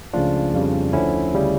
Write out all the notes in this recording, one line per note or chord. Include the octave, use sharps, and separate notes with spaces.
C#2 C#3 F3 A3 D4 F4
F2 C#3 G3
D2 D3 F3 C#4 E4
D2 C#3 G3